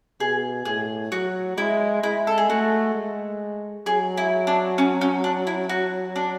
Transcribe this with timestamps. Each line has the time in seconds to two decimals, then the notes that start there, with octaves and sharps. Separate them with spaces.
0.20 B2 G#4
0.65 A2 G#4
1.12 F#3 F#4
1.57 G#3 E4
2.03 G#3 E4
2.27 A4
2.38 G#4
2.49 A3 F#4
2.95 G#3
3.86 F#3 G#4
4.17 E4
4.47 D4
4.78 C#4
5.01 C#4
5.24 D4
5.47 E4
5.69 F#4
6.16 D4